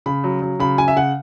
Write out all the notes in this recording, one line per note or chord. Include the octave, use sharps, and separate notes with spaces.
C#3 B5
F#3
F#3
C#3 B5
C#3 G#5
E5
C#3 F#5